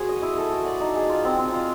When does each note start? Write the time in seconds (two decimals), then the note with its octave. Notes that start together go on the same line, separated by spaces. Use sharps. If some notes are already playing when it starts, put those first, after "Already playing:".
Already playing: F#4 G#4 C5
0.09 D#5
0.22 E4
0.38 A4
0.51 F#4
0.66 D5
0.81 D#4
0.95 G#4
1.09 F4
1.25 C4
1.38 C4
1.53 F4